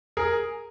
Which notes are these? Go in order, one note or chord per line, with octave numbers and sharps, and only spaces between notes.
G#4 A#4